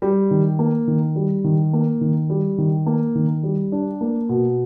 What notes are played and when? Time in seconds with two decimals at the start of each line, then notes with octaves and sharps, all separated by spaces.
0.02 G3
0.31 D#3
0.59 A#3
0.87 D#3
1.16 G3
1.44 D#3
1.73 A#3
2.01 D#3
2.30 G3
2.58 D#3
2.86 A#3
3.15 D#3
3.43 G3
3.72 D4
4.01 A#3
4.29 B2